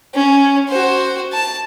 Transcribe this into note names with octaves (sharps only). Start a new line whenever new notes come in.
C#4
F#4 C5
A5